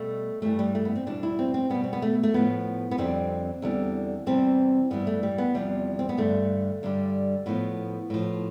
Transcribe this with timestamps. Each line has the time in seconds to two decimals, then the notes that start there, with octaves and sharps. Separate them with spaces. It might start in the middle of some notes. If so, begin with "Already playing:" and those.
Already playing: B2 G3 A3
0.42 G2 E3 G3 A3
0.59 G3
0.75 A3
0.85 B3
0.95 C4
1.06 E2 B2 G3 D4
1.23 E4
1.39 C4
1.54 C4
1.70 B2 G3 B3
1.84 C4
1.93 B3
2.02 A3
2.23 A3
2.34 A2 F3 B3
2.91 B3
2.98 F2 D3 G3 C4
3.62 E2 D3 G3
4.26 E2 C3 E3 G3 C4
4.90 G2 E3 G3 B3
5.07 A3
5.23 G3
5.38 B3
5.54 E2 C3 F3 G3
5.99 C4
6.09 B3
6.18 G2 D3 G3 A3
6.83 G2 D3 G3
7.46 A2 F3 B3
8.10 A2 F3